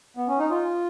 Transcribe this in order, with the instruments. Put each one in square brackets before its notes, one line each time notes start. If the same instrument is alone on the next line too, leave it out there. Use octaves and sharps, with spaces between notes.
[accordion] B3
C#4
D#4
F4